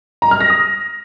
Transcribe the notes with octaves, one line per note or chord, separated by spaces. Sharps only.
A#5
F6
A#6
D#6